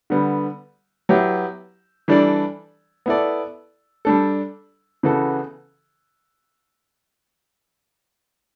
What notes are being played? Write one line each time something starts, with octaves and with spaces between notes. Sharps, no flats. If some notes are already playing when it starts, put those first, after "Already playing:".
D3 G3 B3
F#3 B3 E4 G4
E3 G3 D4 A4 D5
B3 E4 A4 D5
G3 D4 A4
C#3 E3 B3 F#4 A4